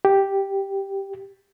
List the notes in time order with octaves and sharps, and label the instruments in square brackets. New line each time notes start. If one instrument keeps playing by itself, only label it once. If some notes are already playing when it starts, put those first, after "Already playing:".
[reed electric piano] G4